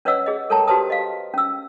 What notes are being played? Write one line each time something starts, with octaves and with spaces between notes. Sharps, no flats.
C#4 B4 C#5 D#5 F#5 E6
G#4 D#5
A4 A#4 C#5 G5 A5 A#5
F#4 G4 B4 C5 A5 D#6
D#5 F5
C#4 E6